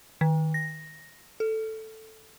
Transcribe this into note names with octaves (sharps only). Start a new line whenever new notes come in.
D#3
A#6
A4